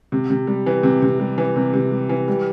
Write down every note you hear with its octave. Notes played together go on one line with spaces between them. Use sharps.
C3
C3
G3
E3
C3
C3
G3
E3
C3
C3
G3
E3
G3